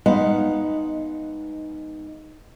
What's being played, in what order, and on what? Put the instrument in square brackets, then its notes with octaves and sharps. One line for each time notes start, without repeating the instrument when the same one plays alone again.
[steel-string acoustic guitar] G#3 B3 D#4 F5 F#5